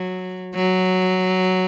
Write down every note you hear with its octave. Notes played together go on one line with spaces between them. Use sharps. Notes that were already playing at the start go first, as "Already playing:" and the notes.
Already playing: F#3
F#3